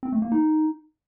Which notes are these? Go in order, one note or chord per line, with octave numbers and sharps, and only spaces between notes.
C4
A3
A#3
D#4